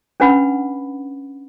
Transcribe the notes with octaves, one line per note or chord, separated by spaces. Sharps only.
C#4 D4 B4 F#5 B5